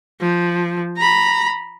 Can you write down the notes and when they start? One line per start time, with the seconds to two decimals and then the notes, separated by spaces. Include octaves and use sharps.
0.21 F3
0.97 A#5 B5